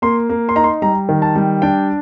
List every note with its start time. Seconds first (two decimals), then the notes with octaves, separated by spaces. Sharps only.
0.02 A#3 C6
0.29 A#3
0.49 C6
0.56 D#4 A#5
0.64 C6
0.82 G3 A#5
1.09 D#3
1.22 A5
1.35 G3
1.62 D4 G5